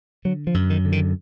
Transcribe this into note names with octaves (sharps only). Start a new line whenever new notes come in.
D3 F#3
F3
F#2
D#3
D3
D#3